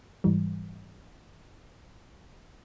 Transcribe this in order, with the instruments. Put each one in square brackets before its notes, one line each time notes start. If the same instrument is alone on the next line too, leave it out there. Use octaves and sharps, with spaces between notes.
[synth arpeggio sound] G#2 E3 G3